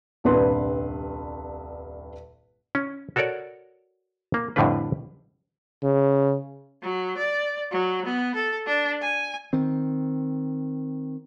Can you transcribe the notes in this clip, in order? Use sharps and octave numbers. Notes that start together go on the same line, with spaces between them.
D#1 C2 G2 B4 C6
C#4
F#4 A4 A#4 C#5 D5
A#3
F2 A2 D3 G3 D4 B4
C#3
F#3
D5
F#3
B3
A4
D4
G#5
D#3 C4